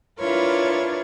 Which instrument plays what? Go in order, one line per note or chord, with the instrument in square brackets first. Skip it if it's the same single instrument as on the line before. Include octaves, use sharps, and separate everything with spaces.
[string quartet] D4 E4 F4 A#4 B4 C#5